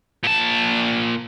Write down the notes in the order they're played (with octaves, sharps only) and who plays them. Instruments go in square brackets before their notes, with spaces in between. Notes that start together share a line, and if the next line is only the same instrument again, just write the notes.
[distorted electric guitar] A#2 A5